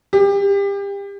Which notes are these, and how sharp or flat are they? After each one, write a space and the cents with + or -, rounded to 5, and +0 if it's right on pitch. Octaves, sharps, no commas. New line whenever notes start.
G4 +30